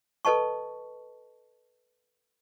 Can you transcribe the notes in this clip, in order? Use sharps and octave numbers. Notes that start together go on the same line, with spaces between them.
A4 B4 D#5 A5 C#6